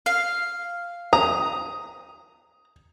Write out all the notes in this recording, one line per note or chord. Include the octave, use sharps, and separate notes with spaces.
F5
A#5 D#6